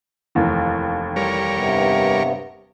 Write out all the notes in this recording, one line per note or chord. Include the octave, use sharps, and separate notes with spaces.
F1 D#2 E3
G3 A#4 C#5
G2 C3 B3